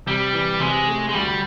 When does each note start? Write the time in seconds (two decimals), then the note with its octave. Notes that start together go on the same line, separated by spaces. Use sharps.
0.06 C3 G3
0.33 E3
0.60 C3 G#3
0.87 A3
1.09 G#3
1.14 D2 G3